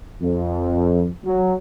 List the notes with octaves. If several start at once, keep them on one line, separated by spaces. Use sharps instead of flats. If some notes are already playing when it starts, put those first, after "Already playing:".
F2
F#3